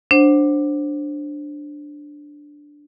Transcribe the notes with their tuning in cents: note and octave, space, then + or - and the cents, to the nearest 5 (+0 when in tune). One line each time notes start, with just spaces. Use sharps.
D4 +0 C5 +15 F#5 +0